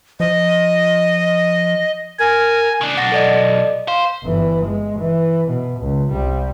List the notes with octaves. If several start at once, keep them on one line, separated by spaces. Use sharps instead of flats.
F3 D#5
A#4 G#5
C#3 D4
B1 F#5 A6 A#6
A4 D5 D#5
C5 F5
G1 E3
G#3
E3
B2
C#2
C2 G3